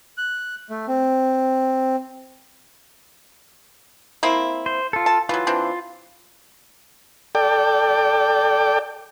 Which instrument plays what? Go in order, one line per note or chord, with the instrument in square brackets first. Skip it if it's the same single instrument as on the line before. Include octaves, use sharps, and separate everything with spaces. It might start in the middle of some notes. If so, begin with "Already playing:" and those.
[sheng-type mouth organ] F#6
A3
C4
[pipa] A#3 C4 E4
[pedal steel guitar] C5
F4 A4
[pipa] A5
[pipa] E3 F#3 [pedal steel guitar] F4
[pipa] E3 C4 D4
[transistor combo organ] A4 D5 G5